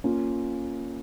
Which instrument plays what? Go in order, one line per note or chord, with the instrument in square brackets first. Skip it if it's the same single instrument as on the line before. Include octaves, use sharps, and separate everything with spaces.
[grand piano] A#3 C#4 F4